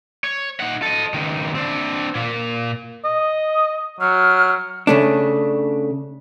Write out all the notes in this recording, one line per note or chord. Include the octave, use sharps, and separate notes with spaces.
C#5
D#4 F#5
A4 D#5
C#2 D#3
C4 D4
A#2 A#3
D#5
F#3 F6
C#3 A3 D4